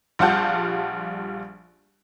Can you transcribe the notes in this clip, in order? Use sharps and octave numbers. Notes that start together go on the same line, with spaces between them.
A#1 G3 F4 F#5 A5 G6